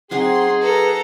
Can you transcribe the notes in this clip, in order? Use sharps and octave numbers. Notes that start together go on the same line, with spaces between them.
F#3 C4 D#4 F#4 G#4 C6
A4 B4 A#5